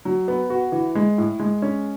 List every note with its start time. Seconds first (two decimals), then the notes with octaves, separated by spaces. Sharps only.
0.05 F#3
0.28 B3
0.50 F#4
0.72 E3
0.95 G#3
1.18 A2
1.40 G#3
1.62 C#4